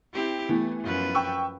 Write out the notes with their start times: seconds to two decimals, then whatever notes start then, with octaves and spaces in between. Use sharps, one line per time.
0.13 C4 E4 G4
0.49 E3 A3 B3
0.83 F#2 F3 B4
1.15 G5 C#6 E6